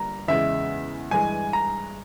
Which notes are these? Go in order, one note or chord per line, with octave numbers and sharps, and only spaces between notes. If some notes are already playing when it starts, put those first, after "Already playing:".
Already playing: G1 G2 G3 A#3 A#5
E2 C#3 G#3 E5
G2 E3 G#3 G#5
A#5